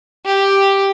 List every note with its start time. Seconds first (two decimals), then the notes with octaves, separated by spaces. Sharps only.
0.25 G4